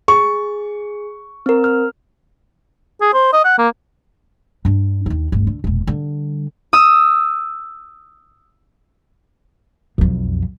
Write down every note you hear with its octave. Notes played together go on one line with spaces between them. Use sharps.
G#4 C#6
C4 A#4
F6
G#4
C5
D#5
F#5
A#3
G2 D4
D#2 D#4
D1 G1
D3
E1 A#2
D3 G3
D#6 E6
B1 F2